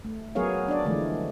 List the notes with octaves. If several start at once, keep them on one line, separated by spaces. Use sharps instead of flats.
A3
F#3 B3 G#4 A#4 C#5 F5
D4 D5
D3 E3 F3 G#3 A3 D4